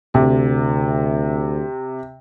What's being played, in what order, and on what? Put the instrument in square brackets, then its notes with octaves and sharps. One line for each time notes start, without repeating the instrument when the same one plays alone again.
[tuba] D2 [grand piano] C3